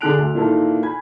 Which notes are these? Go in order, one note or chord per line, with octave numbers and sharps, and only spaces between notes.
D3 D4 G#4 F#6 D7 F7
D2
A#2 D#3 E3 A#3 D#4 A4
G#5 B5 G#6